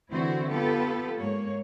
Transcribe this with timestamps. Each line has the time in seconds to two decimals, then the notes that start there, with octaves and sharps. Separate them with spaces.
0.11 D3 E3 C4 E4 F#4 C5
0.50 B3 F4 G4 A4 B4
1.18 G#2 A#3 C#5